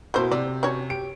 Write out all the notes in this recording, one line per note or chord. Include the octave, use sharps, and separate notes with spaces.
B2 A3 A#3 E4 C5 G6
C3 D5
C#4 F#4 C#5
G4 D7